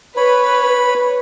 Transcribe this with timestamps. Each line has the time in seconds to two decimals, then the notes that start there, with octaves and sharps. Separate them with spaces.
0.17 B4 C#5 B5